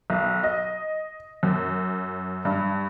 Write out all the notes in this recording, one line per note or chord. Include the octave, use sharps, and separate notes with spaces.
B1
D#5
F#2
G2